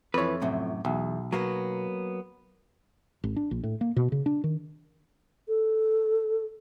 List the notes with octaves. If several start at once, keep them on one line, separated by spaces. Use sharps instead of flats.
F2 E3 B4 C#5
F#2 A2 C3
B1 E2
F#3 A#3 B3
G#1
D4
A#1
A2
A#3
B2
C#3
D4
D#3
A4